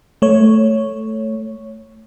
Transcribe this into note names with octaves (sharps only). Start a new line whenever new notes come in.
A3 C#5